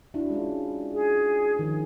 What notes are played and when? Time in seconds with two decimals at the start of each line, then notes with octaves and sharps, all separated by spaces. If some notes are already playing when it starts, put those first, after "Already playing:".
0.14 D4 E4 F#4
0.30 G#3 C#4 F4
0.94 G#4
1.59 D#3 F3 G#4